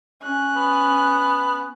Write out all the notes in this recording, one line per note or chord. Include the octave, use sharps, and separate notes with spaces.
C#4 F#6
B3